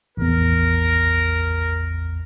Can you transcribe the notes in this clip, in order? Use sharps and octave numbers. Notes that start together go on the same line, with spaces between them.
A1 E2 A#4